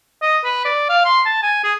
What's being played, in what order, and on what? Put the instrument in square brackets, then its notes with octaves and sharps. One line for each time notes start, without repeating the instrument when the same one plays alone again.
[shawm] D#5
B4
D5
F5
C6
A5
G#5
G#4